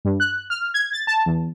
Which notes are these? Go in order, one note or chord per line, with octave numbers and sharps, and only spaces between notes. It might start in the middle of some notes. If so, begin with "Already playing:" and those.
G2
F#6
F6
G#6
A6
A5
E2